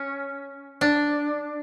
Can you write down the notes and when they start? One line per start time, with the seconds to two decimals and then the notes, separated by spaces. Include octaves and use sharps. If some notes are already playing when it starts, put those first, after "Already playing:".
Already playing: C#4
0.81 D4